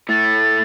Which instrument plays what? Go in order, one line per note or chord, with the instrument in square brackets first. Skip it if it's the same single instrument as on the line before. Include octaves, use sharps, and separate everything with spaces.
[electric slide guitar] A2 A3 [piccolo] A6